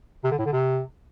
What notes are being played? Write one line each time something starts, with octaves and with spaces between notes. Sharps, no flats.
C3
D3
A2
D3
C3